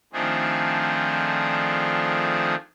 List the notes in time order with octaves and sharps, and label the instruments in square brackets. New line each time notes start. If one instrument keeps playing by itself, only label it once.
[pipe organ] D#3 F3 A3 C4 D4 G#4